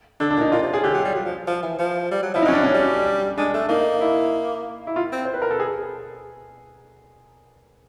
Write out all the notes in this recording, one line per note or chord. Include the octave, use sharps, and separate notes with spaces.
D3 D4
D4
A#2 D#4
A#2 F4
C3
C#3 G#4
D3 G4
F#3
G3
F#3
F3
F3
E3
F3
G3
F#3
F3 E4
D#4
F#3 C#4
D4
C#4
G3
G#3 D4
A3
A#3 D#4
E4
E4
F4
C4
C5
B4
A#4
A4
G#4